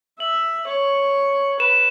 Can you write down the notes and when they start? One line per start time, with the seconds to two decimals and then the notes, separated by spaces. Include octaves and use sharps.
0.19 E5 F#7
0.67 C#5
1.60 B4 E7